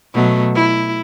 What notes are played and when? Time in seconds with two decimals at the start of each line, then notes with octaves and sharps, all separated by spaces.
0.14 B2 F#3 A3
0.55 E4